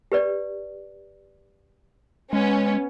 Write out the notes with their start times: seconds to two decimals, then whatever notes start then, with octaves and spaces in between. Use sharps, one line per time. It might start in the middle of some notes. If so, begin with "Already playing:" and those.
0.12 G4 B4 D5
2.33 G#3 B3 C#4